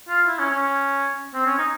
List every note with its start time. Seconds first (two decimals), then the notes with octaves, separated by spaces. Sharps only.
0.09 F4
0.27 E4
0.39 C#4
0.51 C#4
1.34 C4
1.46 C#4
1.58 D#4